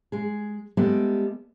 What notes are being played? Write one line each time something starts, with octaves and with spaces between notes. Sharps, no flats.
G#3 G#4
G3 G#3 B3 G4 A4 E5